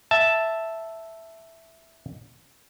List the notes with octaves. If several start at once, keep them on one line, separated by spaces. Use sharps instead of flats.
E5 A5